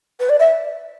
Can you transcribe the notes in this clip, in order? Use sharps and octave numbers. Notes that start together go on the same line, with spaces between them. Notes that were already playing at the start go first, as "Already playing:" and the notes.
B4
D5
E5